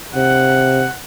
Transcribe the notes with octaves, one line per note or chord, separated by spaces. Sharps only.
C3 F#5